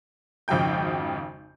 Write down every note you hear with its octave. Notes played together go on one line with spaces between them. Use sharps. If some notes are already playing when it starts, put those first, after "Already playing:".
G#1 F2 C#3 F#4 G5 G6